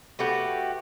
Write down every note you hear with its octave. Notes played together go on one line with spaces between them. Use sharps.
A3 F#4 G4 B4